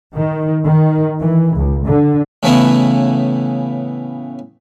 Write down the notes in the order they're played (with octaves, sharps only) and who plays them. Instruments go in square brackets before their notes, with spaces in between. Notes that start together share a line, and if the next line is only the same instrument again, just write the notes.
[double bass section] D#3
D#3
E3
C#2
D3
[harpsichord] A2 C#3 E3 A3 B3 E4